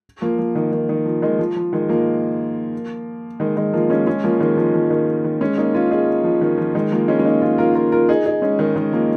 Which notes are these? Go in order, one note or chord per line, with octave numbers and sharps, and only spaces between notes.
F3 A#3
F3
D#3
D#3
D#3
F3
D#3 G#3
F3
F3
D#3 G#3
F3 A#3
D#3 G#3
D#3 G#3
F3 A#3
G#3 C#4
G#3 C#4
F3 A#3
D#3 G#3
F3
F3
D#3
D#3
G#3 C#4
A#3 D#4
C#4 F4
D#4 G#4
F3
D#3
F3
D#3 G#3
F3 A#3
G#3 C#4
C#4
A#3 D#4
C#4 F4
F4 A#4
F4 A#4
F4 A#4
D#4 G#4
D#4 G#4
G#3 C#4
D#3 G#3
D#3 G#3
F3 A#3